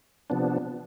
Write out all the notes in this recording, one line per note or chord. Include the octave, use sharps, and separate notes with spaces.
C3 F3 B3 D4